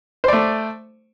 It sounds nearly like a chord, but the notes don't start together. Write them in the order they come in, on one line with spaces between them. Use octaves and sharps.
C5 D5 A3